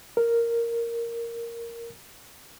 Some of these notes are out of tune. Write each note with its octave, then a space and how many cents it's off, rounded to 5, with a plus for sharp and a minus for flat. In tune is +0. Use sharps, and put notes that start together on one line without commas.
A#4 -5